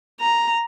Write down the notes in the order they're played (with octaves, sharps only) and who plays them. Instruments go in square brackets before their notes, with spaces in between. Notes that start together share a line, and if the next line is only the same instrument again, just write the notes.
[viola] A#5